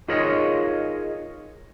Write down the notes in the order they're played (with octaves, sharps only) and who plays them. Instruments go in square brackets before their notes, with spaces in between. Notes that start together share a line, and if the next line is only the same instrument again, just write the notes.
[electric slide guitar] D#4 F4 G#4 A#4 C#5 D#5